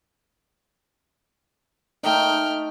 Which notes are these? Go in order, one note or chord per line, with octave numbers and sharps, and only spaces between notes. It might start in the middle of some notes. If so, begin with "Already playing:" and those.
A3 D#4 G5 F6